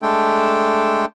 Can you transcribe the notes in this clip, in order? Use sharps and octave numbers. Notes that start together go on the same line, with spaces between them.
G#3 A3 D4 A4 G5